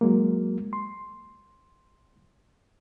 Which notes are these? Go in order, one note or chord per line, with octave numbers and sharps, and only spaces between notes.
F#3 G#3 A#3
C6